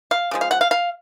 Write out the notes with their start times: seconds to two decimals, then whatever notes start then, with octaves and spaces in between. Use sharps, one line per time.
0.11 F5
0.31 C#3 F3 G#3
0.41 F5
0.51 F#5
0.61 F5
0.71 F5